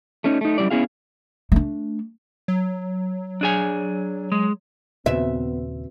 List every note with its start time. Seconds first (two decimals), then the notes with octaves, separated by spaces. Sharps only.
0.24 A3 C#4 D#4
0.41 A3 D#4
0.58 F#2 F3 G3 E4 D5
0.71 B3 C#4 E4 G#4 F5
1.52 A3 D4
2.48 F#3
3.41 D4 G#4 G#5
4.32 G#3
5.06 D#2 A#2 C#3 B3 C4 F#4 B4 E5